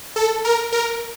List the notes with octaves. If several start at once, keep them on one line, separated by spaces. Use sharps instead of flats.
A4
A#4
A#4